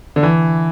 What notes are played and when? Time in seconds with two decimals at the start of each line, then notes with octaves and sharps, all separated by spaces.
0.16 D3
0.23 E3